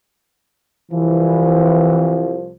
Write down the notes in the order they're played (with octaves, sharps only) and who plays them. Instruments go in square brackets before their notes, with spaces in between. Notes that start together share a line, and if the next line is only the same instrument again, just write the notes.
[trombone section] C2 F3 [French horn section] E3